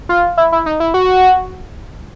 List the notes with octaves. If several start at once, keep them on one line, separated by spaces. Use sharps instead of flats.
F4
E4
E4
D#4
E4
F#4